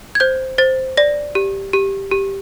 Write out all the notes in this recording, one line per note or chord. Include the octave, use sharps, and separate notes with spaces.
G#6
C5 G6
C5 A6
D5 A#6
G4
G4
G4